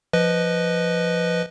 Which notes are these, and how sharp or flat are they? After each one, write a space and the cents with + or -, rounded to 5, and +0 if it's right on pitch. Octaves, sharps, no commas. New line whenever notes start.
F3 +0 B4 +0 D#5 +0